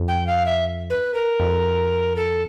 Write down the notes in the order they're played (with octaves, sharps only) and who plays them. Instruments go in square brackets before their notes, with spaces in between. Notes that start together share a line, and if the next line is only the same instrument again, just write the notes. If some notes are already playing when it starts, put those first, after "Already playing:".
Already playing: [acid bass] F2
[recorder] G5
F5
E5
B4
A#4
[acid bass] F2
[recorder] A4